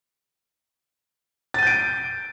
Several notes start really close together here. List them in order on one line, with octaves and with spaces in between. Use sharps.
A6 D#7 G6 D7